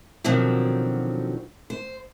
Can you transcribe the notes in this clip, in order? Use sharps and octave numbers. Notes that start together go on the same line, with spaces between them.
B2 D3 D#3 F3 F#3 C4
C5